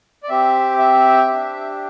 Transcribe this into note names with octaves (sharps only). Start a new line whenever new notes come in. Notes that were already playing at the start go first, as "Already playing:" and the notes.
D5
C4 G4 E5
E5
D4 G4